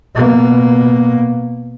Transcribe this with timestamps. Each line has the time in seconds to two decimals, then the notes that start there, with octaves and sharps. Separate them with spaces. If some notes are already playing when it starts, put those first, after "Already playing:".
0.15 B2 A#3